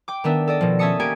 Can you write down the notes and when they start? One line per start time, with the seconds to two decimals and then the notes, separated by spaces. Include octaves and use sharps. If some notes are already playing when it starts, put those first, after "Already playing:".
0.08 G5 D6
0.24 D#3 B3 D4 E5
0.47 A4 D5 D#5
0.61 B2 F3
0.79 C#4 E5 A5 D#6 C#7
1.00 A#3 C#4 G4 G#5 G#6 D7